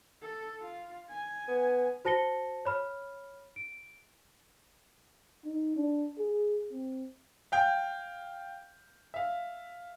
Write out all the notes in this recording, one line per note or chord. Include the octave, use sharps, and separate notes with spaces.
A4
F4
G#5
B3
F#4 C5 A5 A#6 C#7 G7
C#5 B5 F6
D7
D#4
D4
G#4
C4
F5 G5 G6
E5 F5